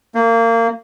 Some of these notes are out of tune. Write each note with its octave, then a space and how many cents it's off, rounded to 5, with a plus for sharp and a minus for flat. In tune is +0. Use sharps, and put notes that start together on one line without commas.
A#3 -25